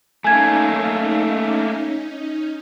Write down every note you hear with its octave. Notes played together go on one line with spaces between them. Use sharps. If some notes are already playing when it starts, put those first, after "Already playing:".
A3 A#3 C#4 D#4 G#5 G#6